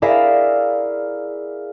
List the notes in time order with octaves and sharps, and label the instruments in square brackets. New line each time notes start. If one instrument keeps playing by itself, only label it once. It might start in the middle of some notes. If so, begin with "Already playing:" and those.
[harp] E4 G#4 A#4 D5 E5 F5